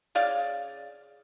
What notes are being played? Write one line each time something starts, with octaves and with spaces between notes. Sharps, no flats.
C#3 D5 F5